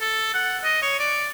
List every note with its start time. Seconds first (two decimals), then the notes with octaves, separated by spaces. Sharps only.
0.01 A4
0.34 F#5
0.64 D#5
0.82 C#5
0.99 D5